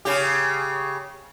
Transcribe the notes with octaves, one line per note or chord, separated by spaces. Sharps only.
C#3 G4